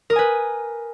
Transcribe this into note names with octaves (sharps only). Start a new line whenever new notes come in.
A#4 B4 G#5 D#6